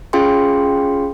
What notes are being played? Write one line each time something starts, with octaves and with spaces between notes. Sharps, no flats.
C#4 F4 G#4 F5 G5 C6